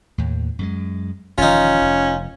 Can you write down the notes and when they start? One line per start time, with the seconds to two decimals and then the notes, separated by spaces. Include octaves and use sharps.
0.18 D#2 A2
0.59 F#2 G3 G#3
1.38 E1 D#3 F3 C#4 D#4 F4
1.81 F1